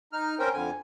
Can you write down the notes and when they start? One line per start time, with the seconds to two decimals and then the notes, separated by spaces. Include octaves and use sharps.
0.13 D#4 F6
0.39 C4 C#4 A#4 C5 G5
0.54 F2 D3 G#5